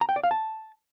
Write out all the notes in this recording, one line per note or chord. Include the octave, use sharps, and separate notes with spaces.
A#5
G5
D5
F5
A5